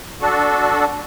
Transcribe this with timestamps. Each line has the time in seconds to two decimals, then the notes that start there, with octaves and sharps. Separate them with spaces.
0.21 D4 F#4 A4